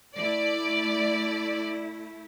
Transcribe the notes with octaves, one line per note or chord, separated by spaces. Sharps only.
A3 E4 D5